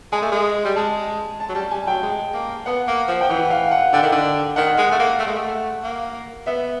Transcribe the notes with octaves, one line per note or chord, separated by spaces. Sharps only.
G#3 G#5
A3
G#3
G3
G#3 A5
A5
F#3
G3 A5
G3 G#5
F#3 G5
G#3
A#3
B3 F#5
A#3
F3
F3 G5
E3 F#5
F5
F#5
D3 G5
D#3
D3
D#3 F#5
G#3
A3
A#3
A3 F#5
G#3
A3
A#3
B3 E5